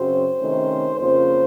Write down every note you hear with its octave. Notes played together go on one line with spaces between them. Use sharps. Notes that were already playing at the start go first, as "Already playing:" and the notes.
Already playing: F#2 C#3 F#3 C4 C5
C3 D#3 A3 C#4
F2 C#3 F3 A#3 C5